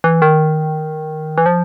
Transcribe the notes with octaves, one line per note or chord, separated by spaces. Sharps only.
E3
D#3
E3
F3